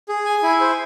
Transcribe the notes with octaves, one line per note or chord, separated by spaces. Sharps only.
G#4
G#5
E4
C5